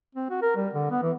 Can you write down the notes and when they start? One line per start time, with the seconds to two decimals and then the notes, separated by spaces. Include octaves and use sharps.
0.15 C4
0.30 F#4
0.42 A#4
0.56 G3
0.73 D3
0.91 B3
1.03 E3